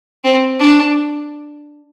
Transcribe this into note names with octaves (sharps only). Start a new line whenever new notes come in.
C4
D4